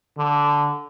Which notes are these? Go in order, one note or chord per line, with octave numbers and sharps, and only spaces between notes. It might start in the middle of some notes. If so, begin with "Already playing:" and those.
D3